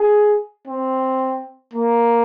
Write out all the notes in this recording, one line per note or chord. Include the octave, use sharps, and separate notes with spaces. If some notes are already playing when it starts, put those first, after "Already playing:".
Already playing: G#4
C4
A#3